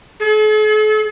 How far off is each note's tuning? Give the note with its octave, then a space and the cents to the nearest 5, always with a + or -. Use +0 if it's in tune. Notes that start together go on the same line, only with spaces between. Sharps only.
A4 -45